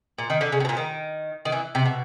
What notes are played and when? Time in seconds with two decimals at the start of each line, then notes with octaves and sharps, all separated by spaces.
0.18 A#2
0.30 D#3
0.41 D3
0.52 C#3
0.60 C3
0.65 B2
0.69 A#2
0.77 D#3
1.45 D#3
1.52 E3
1.75 C3
1.86 B2